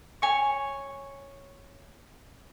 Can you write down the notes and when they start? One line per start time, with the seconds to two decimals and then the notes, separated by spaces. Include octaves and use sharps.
0.22 C#5 G#5 C#6